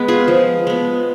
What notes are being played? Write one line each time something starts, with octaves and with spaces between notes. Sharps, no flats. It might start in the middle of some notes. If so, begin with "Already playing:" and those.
Already playing: G#3 B3 B4
F4 G#4
F3
G#3 B3